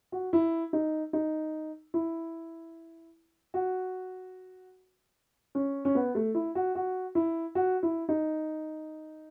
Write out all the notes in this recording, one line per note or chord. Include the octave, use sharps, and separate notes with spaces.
F#4
E4
D#4
D#4
E4
F#4
C#4
C#4
B3
A3
E4
F#4
F#4
E4
F#4
E4
D#4